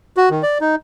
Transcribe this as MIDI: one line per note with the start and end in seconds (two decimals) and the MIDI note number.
0.17 0.29 66
0.31 0.42 51
0.43 0.58 74
0.61 0.75 63